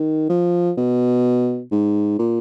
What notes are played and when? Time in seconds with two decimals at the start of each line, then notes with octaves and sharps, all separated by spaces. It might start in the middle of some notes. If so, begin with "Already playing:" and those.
Already playing: D#3
0.29 F3
0.78 B2
1.71 G#2
2.19 A#2